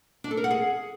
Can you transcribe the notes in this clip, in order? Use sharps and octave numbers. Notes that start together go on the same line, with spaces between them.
D4
A4
A#4
F#5
G#4